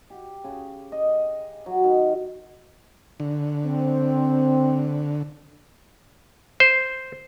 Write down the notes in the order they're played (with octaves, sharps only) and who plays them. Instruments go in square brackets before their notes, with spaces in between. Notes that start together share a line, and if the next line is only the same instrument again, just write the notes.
[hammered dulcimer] G4
C#3
D#5
F#3
D#3
[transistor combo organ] D3
[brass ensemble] C4
[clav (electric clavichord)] C5